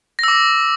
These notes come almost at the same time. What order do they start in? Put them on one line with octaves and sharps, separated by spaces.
A#6 E6 D6